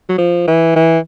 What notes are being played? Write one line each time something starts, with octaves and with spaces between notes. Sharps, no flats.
F#3
F3
E3
E3